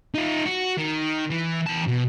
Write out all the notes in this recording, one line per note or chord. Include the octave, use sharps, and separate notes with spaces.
D#4 F4
F#4
D#3
E3
E2 A5
B2